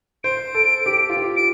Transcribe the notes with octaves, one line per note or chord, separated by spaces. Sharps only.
C5 D7
A4
G4
F4
G4
D7